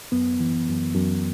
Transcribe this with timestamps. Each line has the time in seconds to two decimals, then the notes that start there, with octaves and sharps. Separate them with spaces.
0.12 F#2 B3
0.40 E3
0.68 F#2
0.95 F#2